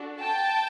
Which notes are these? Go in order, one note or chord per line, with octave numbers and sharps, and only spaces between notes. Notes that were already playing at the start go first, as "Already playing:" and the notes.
Already playing: D4 F#4 A4
G5 A5